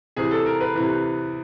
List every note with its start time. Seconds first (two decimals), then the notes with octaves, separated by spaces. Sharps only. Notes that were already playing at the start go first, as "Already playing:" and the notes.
0.16 C3 E3 G#4
0.31 A4
0.46 A#4
0.60 B4
0.75 C3 E3